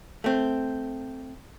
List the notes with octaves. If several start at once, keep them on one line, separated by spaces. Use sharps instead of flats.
A3 C4